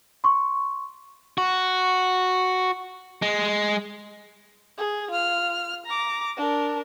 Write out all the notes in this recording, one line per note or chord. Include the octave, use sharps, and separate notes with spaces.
C6 C#6
F#4
G#3
G#4
F4 F6
A#5 D6
D4 A#4